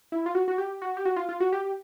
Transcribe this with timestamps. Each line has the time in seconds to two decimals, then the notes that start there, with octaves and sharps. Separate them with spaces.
0.12 E4
0.26 F4
0.35 F#4
0.48 F#4
0.58 G4
0.82 F#4
0.97 G4
1.05 F#4
1.16 F4
1.29 F4
1.40 F#4
1.53 G4